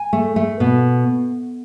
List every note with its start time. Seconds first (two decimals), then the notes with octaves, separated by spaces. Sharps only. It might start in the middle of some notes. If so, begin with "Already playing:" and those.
Already playing: G#5
0.13 A3
0.36 A3
0.60 B2